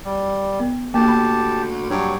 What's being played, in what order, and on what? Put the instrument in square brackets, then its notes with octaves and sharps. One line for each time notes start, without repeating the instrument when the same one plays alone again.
[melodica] G3
[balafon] B3
[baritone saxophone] D2 [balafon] A#3 [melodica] G4 A5
[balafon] B5
[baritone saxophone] G2 [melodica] F#3 C#5